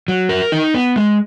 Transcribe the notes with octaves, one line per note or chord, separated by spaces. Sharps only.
F#3
A#4
D#4
B3
G#3